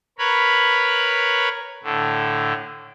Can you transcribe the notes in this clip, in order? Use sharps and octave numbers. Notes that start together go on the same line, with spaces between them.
A#4 B4 C#5 B5
A2 D3